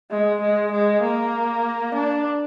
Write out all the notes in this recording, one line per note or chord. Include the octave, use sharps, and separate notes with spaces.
G#3
G#3
G#3
A#3
D4